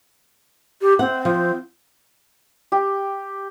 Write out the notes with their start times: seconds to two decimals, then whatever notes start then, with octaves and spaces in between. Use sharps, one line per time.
0.81 G4
0.99 C4 F#5
1.25 F3
2.72 G4